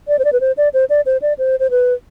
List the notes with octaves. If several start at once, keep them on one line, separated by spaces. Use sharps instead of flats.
D5
C5
D5
B4
C5
D5
C5
D5
C5
D5
C5
C5
B4